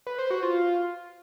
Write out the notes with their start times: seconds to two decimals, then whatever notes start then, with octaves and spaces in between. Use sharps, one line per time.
0.07 B4
0.19 C5
0.31 F#4
0.42 F4